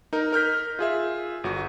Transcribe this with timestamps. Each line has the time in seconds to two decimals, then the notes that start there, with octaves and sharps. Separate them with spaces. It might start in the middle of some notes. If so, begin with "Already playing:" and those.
0.13 D#4 A#4
0.33 A#4 F6 G6 B6
0.79 F4 G#4 E5
1.44 G1 F#4